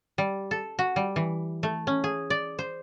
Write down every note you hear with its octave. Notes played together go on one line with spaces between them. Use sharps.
G3
A4
F#4
G3
E3
A3
C#4
G#4
D5
C5